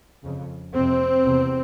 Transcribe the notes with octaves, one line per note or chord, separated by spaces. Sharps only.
F2 C#3
F2 C3 C4
E2 C3